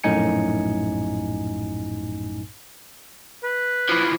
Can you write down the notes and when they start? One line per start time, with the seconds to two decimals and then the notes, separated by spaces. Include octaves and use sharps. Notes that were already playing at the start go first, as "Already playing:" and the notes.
0.04 A#1 F#2 A2 D#4 G#5 C#7
3.43 B4
3.89 E3 F3